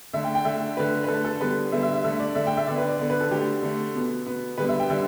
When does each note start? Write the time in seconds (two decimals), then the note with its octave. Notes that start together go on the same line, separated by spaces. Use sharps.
0.13 D3 A3 E5
0.24 G5
0.35 G5
0.45 D3 A3 E5
0.77 D3 A3 B4
1.04 B4
1.08 D3 A3 A4
1.25 A4
1.40 D3 G3 B3 B4
1.72 D3 G3 B3 E5
1.83 E5
1.94 E5
2.04 D3 A3 E5
2.20 D5
2.35 D3 A3 E5
2.47 G5
2.57 E5
2.67 D3 B3 D5
2.78 B4
2.88 D5
2.99 D3 B3
3.10 B4
3.21 A4
3.31 D3 A3 G4
3.62 D3 A3
3.95 B2 B3
4.26 B2 B3
4.58 D3 G3 B3 B4
4.69 E5
4.80 G5
4.90 D3 G3 E5